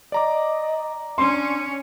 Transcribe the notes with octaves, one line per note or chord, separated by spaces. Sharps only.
D5 D#5 A#5 D6
C#4 D4 C6